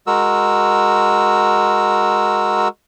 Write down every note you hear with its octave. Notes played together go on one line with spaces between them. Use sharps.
G#3 F#4 A#4 E6